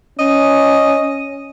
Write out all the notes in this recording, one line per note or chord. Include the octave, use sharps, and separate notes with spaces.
C#4 D#5